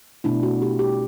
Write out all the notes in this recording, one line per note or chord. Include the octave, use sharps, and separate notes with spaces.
B2 A3 D4 E4
F#4
G4
G4